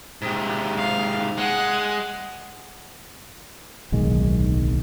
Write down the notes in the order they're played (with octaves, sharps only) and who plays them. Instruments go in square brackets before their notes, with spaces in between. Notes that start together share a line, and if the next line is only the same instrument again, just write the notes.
[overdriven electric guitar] G#2 C3
[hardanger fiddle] F5
[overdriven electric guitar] G#3 [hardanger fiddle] F#5 G#5
[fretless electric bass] D1 B1 D#3 G#3